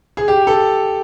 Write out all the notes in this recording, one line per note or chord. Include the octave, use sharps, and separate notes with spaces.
G#4
G4
A4